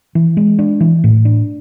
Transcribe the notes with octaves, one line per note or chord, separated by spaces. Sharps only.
E3
G#3
D4
E3
A2
D4